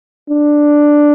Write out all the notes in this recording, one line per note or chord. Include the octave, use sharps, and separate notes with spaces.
D4